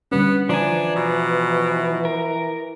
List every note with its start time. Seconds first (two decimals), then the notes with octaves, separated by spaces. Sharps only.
0.12 D3 G3 B3 C#4
0.49 E3 F3 D4 G#5 A#5 D6
0.96 B2
2.05 A#4